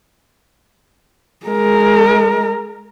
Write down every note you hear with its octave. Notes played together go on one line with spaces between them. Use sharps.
G#3 A#4